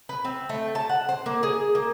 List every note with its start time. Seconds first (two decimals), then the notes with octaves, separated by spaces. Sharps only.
0.09 B4
0.25 C4
0.49 A3
0.75 A5
0.89 F#5
1.09 C5
1.26 A#3
1.43 G#4
1.75 A#3